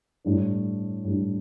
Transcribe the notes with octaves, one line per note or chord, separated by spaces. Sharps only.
A2 G3 D4
A2 G3 D4